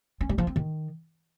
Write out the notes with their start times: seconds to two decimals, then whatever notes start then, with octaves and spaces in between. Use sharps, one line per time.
0.21 C#4
0.29 G3
0.38 F3
0.47 C4
0.56 D#3